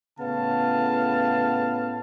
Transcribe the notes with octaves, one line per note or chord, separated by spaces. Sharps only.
A2 C#3 B3 F5 A5